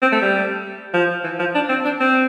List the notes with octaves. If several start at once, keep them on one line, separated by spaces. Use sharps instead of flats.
C4
A3
G3
F3
E3
F3
D4
C4
D4
C4